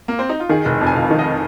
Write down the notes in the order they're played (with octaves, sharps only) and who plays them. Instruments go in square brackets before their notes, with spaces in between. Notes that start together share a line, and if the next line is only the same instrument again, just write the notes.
[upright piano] A#3
C4
D#4
F4
[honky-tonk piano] D#3 [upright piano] G#4
[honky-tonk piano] F1
F2
[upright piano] G#5
[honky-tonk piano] F1 [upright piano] F5
[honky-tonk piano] D#3
[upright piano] D#5